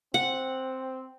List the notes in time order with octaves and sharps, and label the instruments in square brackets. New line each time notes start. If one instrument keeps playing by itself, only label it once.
[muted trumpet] C4 [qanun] F#5